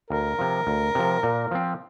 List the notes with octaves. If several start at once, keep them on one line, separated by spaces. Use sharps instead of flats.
D2 A#4
C3 F3
D2
C3 F3
A#2
F3 C4